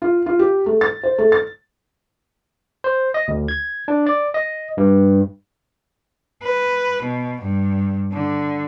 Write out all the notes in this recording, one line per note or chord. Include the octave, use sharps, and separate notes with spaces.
F4
F4
G4
A3
A6
C5
A3
A6
C5
D#5
D2
G#6
D4
D5
D#5
G2
B4
B2
G2
D3